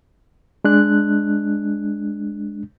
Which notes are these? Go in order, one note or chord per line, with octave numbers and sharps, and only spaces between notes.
G#3 D4 F#6